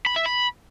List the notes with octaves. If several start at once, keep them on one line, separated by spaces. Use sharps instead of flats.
B5
E5
B5